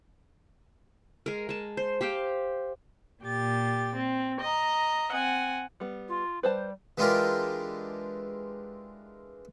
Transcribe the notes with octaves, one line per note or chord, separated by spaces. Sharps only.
G#3 A#4
G#3 A5
C5
G4 C5 F5 G5
A#2 G4 A6
C4
D#5 A#5
C4 F#5 G#5
G3 B3
F4
G3 B4 C5 A5
E3 G#3 D4 F4 G4 A#4